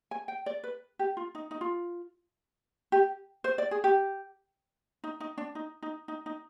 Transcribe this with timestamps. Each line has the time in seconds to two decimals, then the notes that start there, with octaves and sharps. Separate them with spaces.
0.11 G#5
0.28 G5
0.46 D5
0.64 B4
0.99 G4
1.17 F4
1.35 D#4
1.51 D#4
1.61 F4
2.92 G4
3.44 C5
3.58 D5
3.71 G#4
3.84 G4
5.04 D#4
5.20 D#4
5.38 D4
5.55 D#4
5.82 D#4
6.08 D#4
6.26 D#4